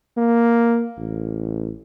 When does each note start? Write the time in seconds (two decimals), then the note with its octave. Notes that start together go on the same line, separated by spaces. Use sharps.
0.17 A#3
0.98 A1